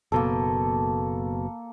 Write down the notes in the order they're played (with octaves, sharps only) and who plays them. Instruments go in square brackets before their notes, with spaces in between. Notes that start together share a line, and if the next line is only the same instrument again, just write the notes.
[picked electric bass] F#1 B2 [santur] A#3 A4